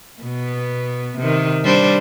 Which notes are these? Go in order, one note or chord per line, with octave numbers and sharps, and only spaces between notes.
B2 B3
C3 D#3
G3 D4 C5